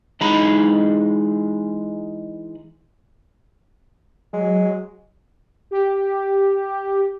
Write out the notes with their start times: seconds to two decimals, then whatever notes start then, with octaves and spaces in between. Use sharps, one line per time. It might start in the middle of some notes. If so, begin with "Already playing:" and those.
0.21 E3 G#3 D#4 A#5 B5
4.33 F#3 G#3
5.71 G4